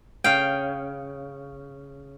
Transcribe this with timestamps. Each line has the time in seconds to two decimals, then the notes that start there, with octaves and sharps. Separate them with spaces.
0.24 C#3 F5 G5